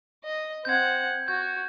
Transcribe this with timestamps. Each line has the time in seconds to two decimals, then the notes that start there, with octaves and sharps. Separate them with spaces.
0.25 D#5
0.65 C4 F#5 G6 G#6
1.28 F#4 G6